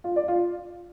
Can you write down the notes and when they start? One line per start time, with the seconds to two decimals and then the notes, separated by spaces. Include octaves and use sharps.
0.04 F4
0.16 D5
0.28 F4